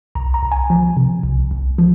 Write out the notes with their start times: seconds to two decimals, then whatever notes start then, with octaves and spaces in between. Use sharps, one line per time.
0.15 C2 A#5
0.34 A#5
0.43 C2
0.52 G#5
0.70 F3
0.97 C3
1.23 C2
1.51 C2
1.78 F3